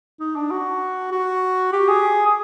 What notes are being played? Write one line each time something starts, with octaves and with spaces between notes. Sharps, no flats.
D#4
D4
F#4
F#4
G4
G#4
G#4